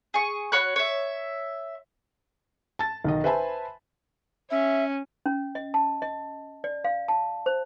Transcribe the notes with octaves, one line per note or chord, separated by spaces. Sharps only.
G#4 C#6
F#4 C#5 B5 F#6
C#5 E5
A5 A6
B1 D#3 D#5
B4 C5 E5 G#5 A5 B5
C#4 E5
C#4
D#5
A5
D#5
D5
F5
A5
C5